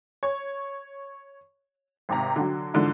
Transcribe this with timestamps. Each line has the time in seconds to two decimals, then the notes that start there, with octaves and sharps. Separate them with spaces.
0.23 C#5
2.09 G#1 C3 A#5
2.36 D3 F#3
2.74 G#2 D3 E3 F3